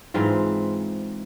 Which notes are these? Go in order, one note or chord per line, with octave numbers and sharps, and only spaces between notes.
G#2 E3 C4 F4